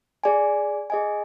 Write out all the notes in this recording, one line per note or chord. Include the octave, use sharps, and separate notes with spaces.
G#4 D5 G#5
G#4 D#5 G#5